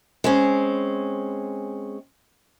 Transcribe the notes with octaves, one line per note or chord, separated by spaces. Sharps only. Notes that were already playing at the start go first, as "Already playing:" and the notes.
G#3 C4 C#4